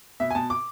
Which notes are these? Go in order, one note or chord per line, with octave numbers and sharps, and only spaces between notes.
B2 E5
G#5
B2 A5
D6